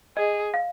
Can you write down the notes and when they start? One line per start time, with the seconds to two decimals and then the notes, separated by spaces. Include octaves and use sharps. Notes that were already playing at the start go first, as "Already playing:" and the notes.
0.17 G#4 D#5
0.54 F5